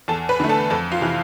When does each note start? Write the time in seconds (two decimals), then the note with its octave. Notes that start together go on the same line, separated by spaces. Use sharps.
0.08 E2 A4 A5
0.29 B4 B5
0.40 D3 A3
0.49 A4 A5
0.70 F2 A4 A5
0.92 F4 F5
1.01 C3 E3